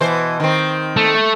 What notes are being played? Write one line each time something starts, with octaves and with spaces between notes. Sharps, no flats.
B2 E3 C5
D#3 C4
A3